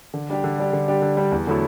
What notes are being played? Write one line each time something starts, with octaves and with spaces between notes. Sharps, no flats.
D3
G3 D4 G4
D3
G3 D4 G4
D3
G3 D4 G4
D3
G3 D4 G4
E2
D3 F#3 A3 E4